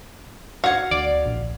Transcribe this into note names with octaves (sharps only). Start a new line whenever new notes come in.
F#4 F5 F#5 G#6
D2 D5
A#1